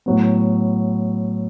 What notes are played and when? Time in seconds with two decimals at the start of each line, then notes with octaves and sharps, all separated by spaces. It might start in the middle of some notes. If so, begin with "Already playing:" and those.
0.06 A2 F#3 B3